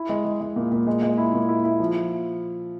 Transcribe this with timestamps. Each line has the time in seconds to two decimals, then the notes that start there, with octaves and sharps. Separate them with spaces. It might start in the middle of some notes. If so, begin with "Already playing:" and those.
Already playing: E4
0.09 G#3
0.25 G#3
0.41 G#3
0.56 A#2
0.71 A#2
0.87 G#3
1.03 G#3
1.18 E4
1.34 A#2
1.49 E4
1.64 E4
1.80 F3